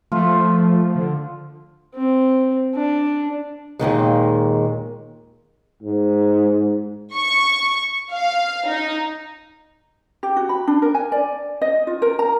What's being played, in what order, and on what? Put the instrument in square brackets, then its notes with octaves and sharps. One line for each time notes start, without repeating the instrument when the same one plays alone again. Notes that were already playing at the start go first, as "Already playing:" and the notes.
[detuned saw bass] F3 [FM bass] A3 [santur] F4
[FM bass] D3
[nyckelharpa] C4
D4
[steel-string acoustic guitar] D#2 A#2 D#3 G#3
[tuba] G#2
[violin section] C#6
F5
D#4
[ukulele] G4
F#4
B5
D4
A#4
G#5
D5
D#5
F4
A#4
A#5